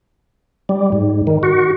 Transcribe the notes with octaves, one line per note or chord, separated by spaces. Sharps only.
G3
G#2
D#3
F#4